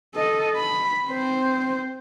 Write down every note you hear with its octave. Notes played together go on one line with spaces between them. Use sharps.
A4 D#5
B5
C4 C5